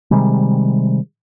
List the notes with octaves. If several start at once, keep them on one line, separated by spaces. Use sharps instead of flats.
C3 D#3 G3 G#3